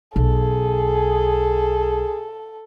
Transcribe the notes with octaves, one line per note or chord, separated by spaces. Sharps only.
B1 G#4 A4